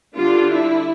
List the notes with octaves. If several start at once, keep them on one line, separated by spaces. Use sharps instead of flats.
D3 G3 D4 F4
E4